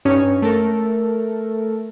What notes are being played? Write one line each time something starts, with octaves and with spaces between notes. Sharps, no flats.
G2 C#4 D#4 C#5
A3 A4 A#4